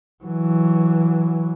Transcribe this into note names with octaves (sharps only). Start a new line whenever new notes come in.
E3 F#3